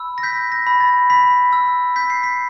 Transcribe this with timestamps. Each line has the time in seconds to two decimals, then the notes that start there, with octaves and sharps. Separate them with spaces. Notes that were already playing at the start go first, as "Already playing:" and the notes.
Already playing: B5 E6
0.18 A#6
0.23 G6 B6
0.52 A#6
0.67 B5
0.81 A6
1.10 B5 B6
1.53 E6
1.96 G6 B6
2.10 C7
2.23 B6